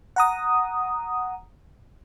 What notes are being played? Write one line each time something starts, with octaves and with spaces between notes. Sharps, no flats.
F#5 A#5 D#6